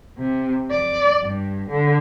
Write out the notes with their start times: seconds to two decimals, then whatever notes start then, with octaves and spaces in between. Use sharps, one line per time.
0.18 C3
0.71 D5
1.22 G2
1.70 D3